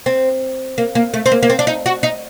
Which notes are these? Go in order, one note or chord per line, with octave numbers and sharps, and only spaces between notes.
C4
A#3
A#3
A3
C4
A#3
A#3
C4
D4
D#4
F#4
D#4